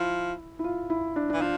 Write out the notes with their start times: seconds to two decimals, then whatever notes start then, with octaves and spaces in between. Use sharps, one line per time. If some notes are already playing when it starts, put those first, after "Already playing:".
Already playing: F3 E4
0.59 E4
0.64 F4
0.90 E4
1.16 D4
1.30 D4
1.34 E3
1.41 F3 D4